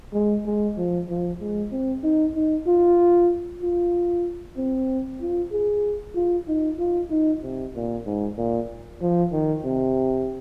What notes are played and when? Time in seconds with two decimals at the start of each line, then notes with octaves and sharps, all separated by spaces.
0.13 G#3
0.46 G#3
0.77 F3
1.09 F3
1.41 G#3
1.72 C4
2.03 D#4
2.35 D#4
2.67 F4
3.62 F4
4.57 C4
5.21 F4
5.52 G#4
6.15 F4
6.48 D#4
6.79 F4
7.10 D#4
7.43 C3
7.75 A#2
8.06 G#2
8.38 A#2
9.02 F3
9.32 D#3
9.64 C3